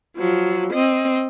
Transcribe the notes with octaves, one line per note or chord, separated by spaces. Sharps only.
F3 F#3
C4 D#5